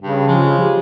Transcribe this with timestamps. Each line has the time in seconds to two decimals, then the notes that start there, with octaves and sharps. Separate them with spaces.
0.02 G2 C#3
0.28 F3 G#3
0.61 G4